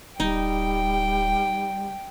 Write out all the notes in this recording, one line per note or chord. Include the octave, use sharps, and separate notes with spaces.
D1 G3 D#4 G5